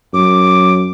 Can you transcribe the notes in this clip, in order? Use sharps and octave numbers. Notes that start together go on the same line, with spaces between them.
F#2 D6